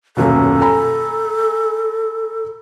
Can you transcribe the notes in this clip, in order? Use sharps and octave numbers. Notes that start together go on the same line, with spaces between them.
D#1 F#2 B2 A4
G#5 A#5 B5